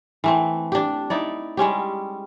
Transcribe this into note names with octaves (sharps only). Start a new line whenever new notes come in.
E3 A3 C4
D4 G4
D#4 E4 D5
G3 G#3 C#4 G4